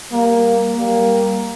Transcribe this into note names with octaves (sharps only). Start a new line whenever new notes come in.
G3 A#3
G3 A#3